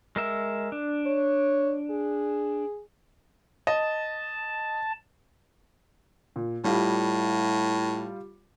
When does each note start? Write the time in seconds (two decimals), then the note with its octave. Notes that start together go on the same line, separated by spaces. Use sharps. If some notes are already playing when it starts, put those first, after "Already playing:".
0.16 G#3 A#4 E5
0.72 D4
1.06 C#5
1.91 G#4
3.67 D#5 A5
6.36 A#2
6.64 A2 G3 F4